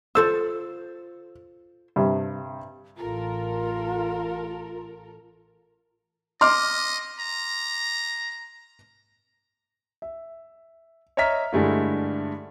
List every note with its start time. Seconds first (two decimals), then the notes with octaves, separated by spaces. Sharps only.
0.15 F4 A4 C5 E6
1.96 G2 C3
2.97 A1 F4 A4 A#4
6.41 D#5 C6 D6 F6
7.19 A#5
10.02 E5
11.17 C#5 D#5 E5 A#5 F6 B6
11.53 G2 D3 G#3 A3 E4